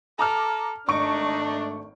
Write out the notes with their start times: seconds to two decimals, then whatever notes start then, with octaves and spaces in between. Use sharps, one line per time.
0.19 A4 A#5 D6 F6
0.88 G#1 A3 D4 D#4 C#6 D7